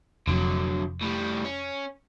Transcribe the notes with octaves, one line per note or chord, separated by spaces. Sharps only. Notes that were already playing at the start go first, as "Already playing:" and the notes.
F1 F2 D3 F#3
A2 G3
C#4